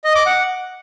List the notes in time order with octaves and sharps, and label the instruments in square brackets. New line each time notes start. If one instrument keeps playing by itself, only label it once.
[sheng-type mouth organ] D#5
D6
F#5